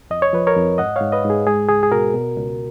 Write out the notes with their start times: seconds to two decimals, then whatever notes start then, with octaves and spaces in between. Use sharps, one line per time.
0.10 F2 D#5
0.22 C#5
0.33 F3 B4
0.47 A#4 C#5
0.57 F2
0.78 G#2 D#5 F#5
0.96 G#2 C#5 F5
1.12 B4 D#5
1.25 G#2
1.30 G#4
1.47 G#3 G#4
1.69 C#2 G#4
1.83 G#4
1.91 B2 F#4 A#4
2.14 B2
2.37 C#2